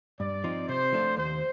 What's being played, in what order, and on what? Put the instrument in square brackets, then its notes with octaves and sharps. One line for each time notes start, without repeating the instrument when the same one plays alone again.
[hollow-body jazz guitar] G2 [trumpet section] D5
[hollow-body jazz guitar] F3 C4 D#4
[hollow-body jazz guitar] C3 [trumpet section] C5
[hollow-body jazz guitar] F3 A3 D4 F4
[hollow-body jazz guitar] D#2 [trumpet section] C5